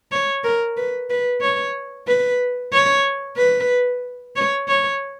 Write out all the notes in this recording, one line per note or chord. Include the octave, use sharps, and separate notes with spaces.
C#5
A#4
B4
B4
C#5
B4
C#5
B4
C#5
C#5